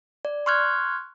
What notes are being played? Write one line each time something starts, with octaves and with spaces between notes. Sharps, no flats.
D5
C6 C#6 F6 F#6 G#6